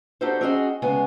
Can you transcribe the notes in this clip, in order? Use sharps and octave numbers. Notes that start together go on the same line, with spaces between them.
D4 D#4 F#4 G4 A4 C5
C4 C#4 D#4 F#4 G#4 D#5
D2 C#3 G#3 B3 G#5